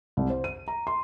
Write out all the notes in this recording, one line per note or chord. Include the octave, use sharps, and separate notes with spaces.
C2
C5
D#7
A#5
C6